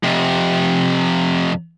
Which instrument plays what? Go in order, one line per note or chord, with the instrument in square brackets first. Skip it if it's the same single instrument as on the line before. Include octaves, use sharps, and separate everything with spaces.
[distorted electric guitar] F2 C3